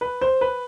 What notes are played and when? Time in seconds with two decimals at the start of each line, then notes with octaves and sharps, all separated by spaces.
0.01 B4
0.21 C5
0.41 B4